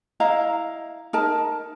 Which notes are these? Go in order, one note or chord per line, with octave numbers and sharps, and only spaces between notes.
E4 D#5 F5 A#5
D#4 A#4 A5